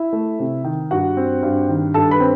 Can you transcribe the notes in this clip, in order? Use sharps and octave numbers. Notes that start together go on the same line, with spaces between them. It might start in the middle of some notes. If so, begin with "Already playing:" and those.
Already playing: E4 E5
A3
C3
D#3
G2 F#4 F#5
C4
G2
D#3
G2 A4 A5
B4 B5
C4